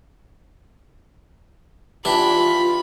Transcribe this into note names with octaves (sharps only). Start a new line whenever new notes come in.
E3 D4 F4 G4 B5